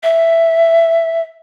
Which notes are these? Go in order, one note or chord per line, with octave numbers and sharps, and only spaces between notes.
E5